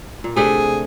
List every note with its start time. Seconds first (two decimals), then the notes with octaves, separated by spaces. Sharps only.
0.24 A#2
0.36 C3 A3 D4 G#4